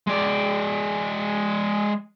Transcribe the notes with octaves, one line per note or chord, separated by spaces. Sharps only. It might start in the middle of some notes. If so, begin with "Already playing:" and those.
G#3 D5